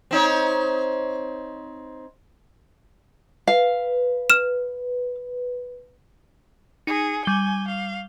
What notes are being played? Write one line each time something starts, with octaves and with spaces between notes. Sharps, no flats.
C4 D#4 C#5
B4 F5
F6 E7
D#4 G#4 C#7
G3 G#5 G7
F5